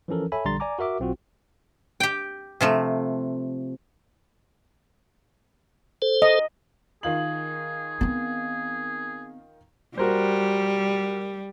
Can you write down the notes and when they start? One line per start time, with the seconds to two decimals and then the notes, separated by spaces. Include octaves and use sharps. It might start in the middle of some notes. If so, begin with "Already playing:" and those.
0.08 E3 F3 C#4 A4 A#4
0.32 A4 C#5 E5 G#5 B5
0.45 A#1 D3 G3 A#5 C6 A6
0.60 D5 G#5 A#5 D6
0.79 F#4 A#4 E5 D6
1.00 B1 C4 F4 F#4
2.00 G4 G5
2.61 C3 F3 A3
6.02 A4 C5
6.22 D#5
7.03 D#3 F4 G#4 F#7
8.01 B3 C4
9.98 G3 F#4 A#4 C5